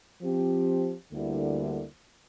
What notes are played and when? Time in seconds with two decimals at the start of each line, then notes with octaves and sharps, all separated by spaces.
0.20 F3 C4 G4
1.11 D2 D3 G3 A#3 E4